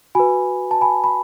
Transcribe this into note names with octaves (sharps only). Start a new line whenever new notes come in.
F#4 B4 G#5 B5
A5
G#5 B5
B5